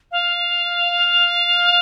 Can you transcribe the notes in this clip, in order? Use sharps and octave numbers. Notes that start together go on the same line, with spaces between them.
F5